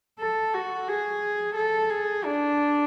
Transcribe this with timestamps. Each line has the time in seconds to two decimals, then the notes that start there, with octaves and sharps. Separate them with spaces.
0.20 A4
0.54 F#4
0.88 G#4
1.55 A4
1.90 G#4
2.24 D4